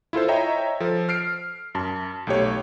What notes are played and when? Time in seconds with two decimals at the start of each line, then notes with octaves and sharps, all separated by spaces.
0.13 E4 F4 A4 C5
0.28 C#5 D#5 E5 G5 A#5
0.80 F3 A4
1.09 F6 C7 D7
1.75 F#2 A5
2.27 B1 A3 G4 C#5